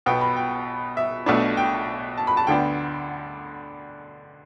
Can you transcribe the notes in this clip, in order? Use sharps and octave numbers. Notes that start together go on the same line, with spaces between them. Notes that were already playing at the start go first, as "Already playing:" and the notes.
B1 B2 B3 G5
B5
G5
E5
B1 B2 A3 D4
G5
A5
B5
A5
D2 D3 B3 D4 G5